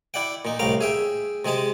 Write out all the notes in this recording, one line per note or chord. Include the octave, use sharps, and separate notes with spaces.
E4 D5 F#5 G5
A#2 D#4
C2 A2 F5 G5 A#5
G#4 E5 G5
C3 G#3 G#4 A5